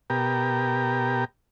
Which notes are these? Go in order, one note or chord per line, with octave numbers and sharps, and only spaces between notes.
B2 G4 A#4